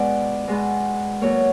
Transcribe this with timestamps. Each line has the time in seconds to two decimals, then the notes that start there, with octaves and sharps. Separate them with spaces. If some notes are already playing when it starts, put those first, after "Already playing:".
Already playing: B2 G#3 B3 D5
0.47 B2 G#3 B3
1.21 B2 F#3 A#3 C#5